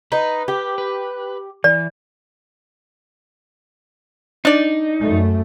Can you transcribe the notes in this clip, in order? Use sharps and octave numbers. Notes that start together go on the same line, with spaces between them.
D#4 B4
G4
B4
E3 D5
D4 D#4 D5
F#2 A3